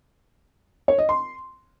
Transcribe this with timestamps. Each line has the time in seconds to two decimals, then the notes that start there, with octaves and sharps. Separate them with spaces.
0.88 C#5
0.98 D#5
1.09 C6